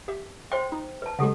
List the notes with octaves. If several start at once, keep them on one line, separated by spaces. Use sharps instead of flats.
G4 E5
C5 G5 C6
D#4
B4 A5
C#3 F#3 G#3 G4 A4 F#5